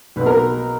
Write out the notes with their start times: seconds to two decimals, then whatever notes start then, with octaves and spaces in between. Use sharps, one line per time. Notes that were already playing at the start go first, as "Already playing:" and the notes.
0.16 B1 B2 B4
0.26 A#4